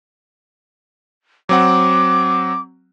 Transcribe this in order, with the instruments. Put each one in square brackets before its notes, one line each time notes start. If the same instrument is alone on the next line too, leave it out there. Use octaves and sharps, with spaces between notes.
[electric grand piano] F#3 C4 F#5 [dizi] D6